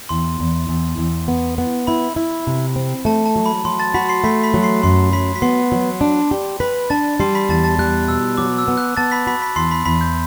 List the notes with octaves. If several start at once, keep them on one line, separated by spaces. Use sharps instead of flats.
E2 C6
E2
E2
E2
B3
B3
E4 B5
E4
C3
C4
A3 A5
A5
F#3
B5
F#3 C6
A5 A6
F#4 B5 B6
C6 C7
A3 B5 B6
B5 B6
F#3
C6 C7
F#2 C6 C7
F#3 B5 B6
B6
B3 C6 C7
F#3
D4
G4
B4 B5 B6
D4 A5 A6
G3 C6 C7
B5 B6
E2 A5 A6
A5 A6
G3 F#6
B2 E6
F#3 D6
E6
B3
F#6
B3 A5 A6
B5 B6
F#4 B5 B6
B5 B6
E2 C6 C7
B5 B6
E2 B5 B6
G6